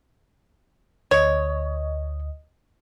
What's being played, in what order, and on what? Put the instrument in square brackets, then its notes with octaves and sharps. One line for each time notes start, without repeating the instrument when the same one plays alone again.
[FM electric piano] D2 D#5 [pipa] C#5